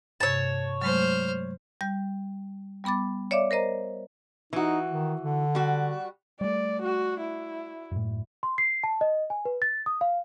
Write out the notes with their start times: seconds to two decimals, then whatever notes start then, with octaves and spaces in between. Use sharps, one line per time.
0.20 G2 C3 C#5 A5
0.82 F#3 G#3 A3 C5 F6
1.81 G3 G6
2.84 G3 B3 B5 D6 A6
3.31 C#5 D5 E5 F5 D6
3.51 A#4 C5 D#5 A#5
4.53 E3 D#4 F#4
4.91 D#3
5.21 D3
5.55 G3 F#4
6.41 G3 A3 D5
6.82 F#4
7.21 E4
7.91 F#2 A2
8.43 C6
8.58 C7
8.84 A5
9.01 D#5
9.30 G#5
9.45 B4
9.62 A6
9.86 D#6
10.01 F5